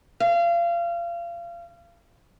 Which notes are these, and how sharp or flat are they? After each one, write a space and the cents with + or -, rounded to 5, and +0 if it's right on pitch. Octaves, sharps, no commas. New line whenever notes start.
F5 -30